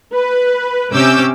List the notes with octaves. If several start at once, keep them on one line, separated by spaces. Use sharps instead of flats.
B4
C3 C#4 D6 E6 G6